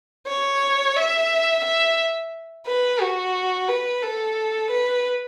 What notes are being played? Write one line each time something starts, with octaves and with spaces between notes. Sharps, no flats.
C#5
E5
E5
B4
F#4
B4
A4
B4